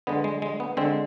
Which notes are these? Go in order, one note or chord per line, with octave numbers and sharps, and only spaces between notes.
D3 G#3 B3
G#3
G#3
B3
D3 G#3 C4